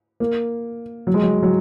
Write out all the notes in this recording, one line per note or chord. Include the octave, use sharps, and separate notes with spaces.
A#3
F#3
G#3
F#3
F#3